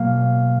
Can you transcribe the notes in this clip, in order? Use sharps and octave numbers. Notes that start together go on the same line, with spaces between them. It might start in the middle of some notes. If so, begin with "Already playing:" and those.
Already playing: B2 F#3 A#3 F5